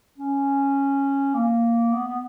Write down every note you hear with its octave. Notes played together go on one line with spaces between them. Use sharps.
C#4
A#3
B3
B3